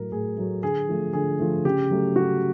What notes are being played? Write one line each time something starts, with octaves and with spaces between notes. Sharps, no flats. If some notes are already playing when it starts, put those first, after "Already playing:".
Already playing: A2 F#3 A3 A#4
A2 G#4
F#3 A3
D3 G#4
F3 A3
D3 G#4
F3 A3
C#3 G4
F#3 A3
C#3 F#4